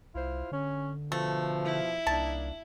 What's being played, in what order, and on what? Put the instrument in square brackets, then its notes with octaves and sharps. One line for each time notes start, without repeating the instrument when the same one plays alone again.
[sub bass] C2 [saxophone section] E4 F4 C5
[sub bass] D3 [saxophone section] C#4
[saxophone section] B2 F3 [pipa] A3
[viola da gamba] E4
[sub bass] C2 [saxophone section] A#3 D4 D#4 [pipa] A5